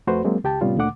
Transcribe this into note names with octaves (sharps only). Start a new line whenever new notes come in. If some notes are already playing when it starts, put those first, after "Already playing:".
F2 A3 F#4 B4 C5
F#3 G#3 A#3 C4
C#2 G4 G5 A5
A2 C3 G3 B3 C#4 F4
D2 A#2 D3 A3 F#5 D6